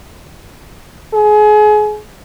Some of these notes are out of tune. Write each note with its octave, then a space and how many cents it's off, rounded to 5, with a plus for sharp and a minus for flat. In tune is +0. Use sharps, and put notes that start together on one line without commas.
G#4 +30